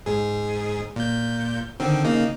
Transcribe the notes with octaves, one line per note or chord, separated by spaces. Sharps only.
G#2 G#4
A#2 G6
D3 D#3 C4
C#3 A#3 D#4